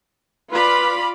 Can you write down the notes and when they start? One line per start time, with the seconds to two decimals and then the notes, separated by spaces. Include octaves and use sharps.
0.52 F4 B4 D5 B5